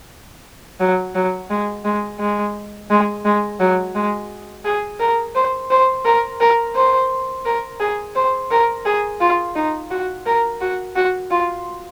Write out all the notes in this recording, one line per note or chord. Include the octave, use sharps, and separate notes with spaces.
F#3
F#3
G#3
G#3
G#3
G#3
G#3
F#3
G#3
G#4
A#4
C5
C5
A#4
A#4
C5
A#4
G#4
C5
A#4
G#4
F4
D#4
F#4
A#4
F#4
F#4
F4